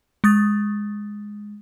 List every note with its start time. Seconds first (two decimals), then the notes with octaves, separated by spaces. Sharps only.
0.24 G#3 D#6 A6